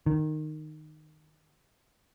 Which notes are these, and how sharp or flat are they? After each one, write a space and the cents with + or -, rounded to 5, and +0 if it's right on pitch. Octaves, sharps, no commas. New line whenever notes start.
D#3 -15